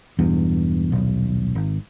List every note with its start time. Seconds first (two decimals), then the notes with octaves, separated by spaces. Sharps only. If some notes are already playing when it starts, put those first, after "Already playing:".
0.19 E1 E2 G2
0.92 D#1 B1
1.55 G#1